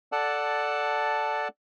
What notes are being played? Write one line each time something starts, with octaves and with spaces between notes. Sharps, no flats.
A4 D5 F#5 A5